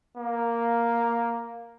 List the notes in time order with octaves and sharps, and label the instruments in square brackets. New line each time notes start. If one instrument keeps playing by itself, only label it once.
[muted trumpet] A#3